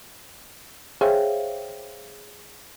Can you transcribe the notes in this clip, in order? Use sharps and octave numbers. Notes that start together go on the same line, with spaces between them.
G#4 C5 C#5 E5 F5 G5